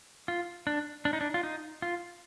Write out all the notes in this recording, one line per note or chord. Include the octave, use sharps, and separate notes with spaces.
F4
D4
D4
D#4
D4
F4
D#4
F4